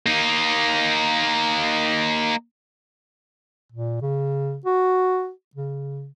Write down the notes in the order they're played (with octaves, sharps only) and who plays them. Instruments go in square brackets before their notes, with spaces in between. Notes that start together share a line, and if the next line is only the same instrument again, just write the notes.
[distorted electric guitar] A#3 D#4
[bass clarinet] A#2
C#3
F#4
C#3